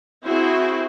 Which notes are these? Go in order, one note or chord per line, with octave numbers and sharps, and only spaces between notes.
C4 E4 F#4 G#4 C5